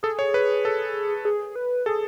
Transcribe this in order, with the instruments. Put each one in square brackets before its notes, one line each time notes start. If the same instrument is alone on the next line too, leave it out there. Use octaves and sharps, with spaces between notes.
[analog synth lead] G#4 [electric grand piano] A4
[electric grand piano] C#5
B4
A4
[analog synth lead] G#4
B4
[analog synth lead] G#4 [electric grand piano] A4